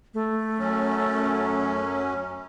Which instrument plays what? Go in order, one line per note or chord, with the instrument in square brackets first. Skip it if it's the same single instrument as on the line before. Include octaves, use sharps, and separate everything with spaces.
[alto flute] A3
[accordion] F#2 F#3 C#4